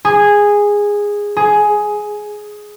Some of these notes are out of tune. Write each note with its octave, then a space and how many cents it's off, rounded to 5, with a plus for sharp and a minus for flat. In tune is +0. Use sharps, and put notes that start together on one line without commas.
G#4 -10
G#4 +10